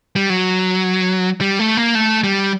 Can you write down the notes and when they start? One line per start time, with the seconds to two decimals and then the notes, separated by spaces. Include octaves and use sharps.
0.16 G3
0.30 F#3
1.41 G3
1.59 A3
1.77 A#3
1.95 A3
2.24 G3